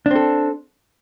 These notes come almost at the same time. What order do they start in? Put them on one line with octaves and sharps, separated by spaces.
D4 C4 A4